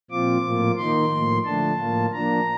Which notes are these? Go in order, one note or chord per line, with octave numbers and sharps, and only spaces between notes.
A#2 F3 C4 F4 D6
A2 F3 A#3 F4
D#3 A#3 D#4 C6
A2 F3 A#3
D3 F3 A3 D4 A5
A2 F3 A#3 F4
F3 A#3 D4 A#5